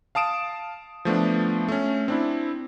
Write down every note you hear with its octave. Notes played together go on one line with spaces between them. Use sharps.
F5 A5 D#6 D7 E7
F3 A3 B3 D4
A3 C#4
C4 D4 E4